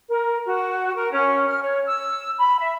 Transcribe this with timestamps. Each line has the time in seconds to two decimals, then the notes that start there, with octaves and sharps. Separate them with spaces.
0.08 A#4
0.45 F#4
0.96 A#4
1.11 C#4
1.48 F6
1.63 C#5
1.86 E6
2.39 B5
2.59 E5